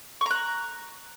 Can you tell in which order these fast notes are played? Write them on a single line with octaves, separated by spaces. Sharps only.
C#6 A#5 F#6